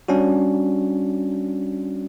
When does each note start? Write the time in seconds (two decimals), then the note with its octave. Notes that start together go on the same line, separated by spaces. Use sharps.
0.08 G3 C#4 D4 F#4